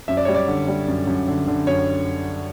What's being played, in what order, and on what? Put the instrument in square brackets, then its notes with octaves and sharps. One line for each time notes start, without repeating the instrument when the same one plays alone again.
[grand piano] F#2 E5
D5
G3 C#5
D5
D3
G3
F#2
F#2
D3
D3
F#2 C#5